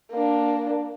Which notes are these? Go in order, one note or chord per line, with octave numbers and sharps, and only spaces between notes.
A#3 D4